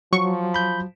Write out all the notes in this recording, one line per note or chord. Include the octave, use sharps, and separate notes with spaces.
F3 F#3 C#6
B5 G6